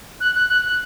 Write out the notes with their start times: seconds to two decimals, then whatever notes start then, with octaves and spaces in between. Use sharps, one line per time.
0.21 F#6
0.35 F#6
0.50 F#6
0.65 F#6